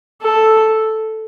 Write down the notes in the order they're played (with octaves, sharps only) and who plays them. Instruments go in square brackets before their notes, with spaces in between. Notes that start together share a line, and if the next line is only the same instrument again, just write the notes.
[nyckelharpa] A4